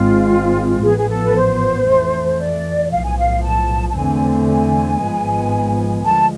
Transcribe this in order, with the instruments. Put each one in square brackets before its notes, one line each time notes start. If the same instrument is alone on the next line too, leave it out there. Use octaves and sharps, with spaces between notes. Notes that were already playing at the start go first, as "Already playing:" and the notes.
Already playing: [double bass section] G#1 G#2 G#3 C4 [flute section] F4
[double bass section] A1 G#2 F3 B3 [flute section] G#4
[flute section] G#4
A4
B4
C5
[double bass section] F2 E3 A3
[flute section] D5
[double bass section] B1 A2 F3 [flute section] F5
[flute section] G#5
F5
A5
A5
[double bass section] E2 D3 A3 C4 [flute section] G#5
[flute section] G#5
[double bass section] G#1 G#2 F3 G#3 B3
[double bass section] D2 D3 F3 G#3 [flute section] A5